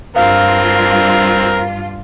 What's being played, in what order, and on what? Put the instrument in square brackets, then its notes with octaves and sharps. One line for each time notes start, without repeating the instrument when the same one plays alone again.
[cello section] G2 G3 F4 [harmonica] C4 A#4 [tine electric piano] F5